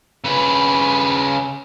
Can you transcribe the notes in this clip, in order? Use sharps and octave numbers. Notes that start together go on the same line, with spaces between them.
C#3 B4